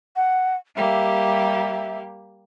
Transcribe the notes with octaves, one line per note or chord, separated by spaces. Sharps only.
F#5
G3 A#3 G4 E5